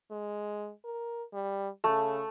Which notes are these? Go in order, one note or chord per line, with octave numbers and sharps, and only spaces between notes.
G#3
A#4
G3
C#3 A3